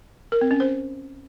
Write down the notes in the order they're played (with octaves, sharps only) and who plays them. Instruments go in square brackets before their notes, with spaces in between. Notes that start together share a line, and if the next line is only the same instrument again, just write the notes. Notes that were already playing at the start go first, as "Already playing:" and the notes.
[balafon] A#4
C4
C#4
C5